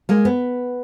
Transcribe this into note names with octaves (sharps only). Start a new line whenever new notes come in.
G#3 A#3
B3